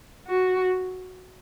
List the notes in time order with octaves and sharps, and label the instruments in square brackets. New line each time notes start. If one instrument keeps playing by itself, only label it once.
[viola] F#4